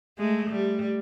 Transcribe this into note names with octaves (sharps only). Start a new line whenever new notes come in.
G#3 A3
G3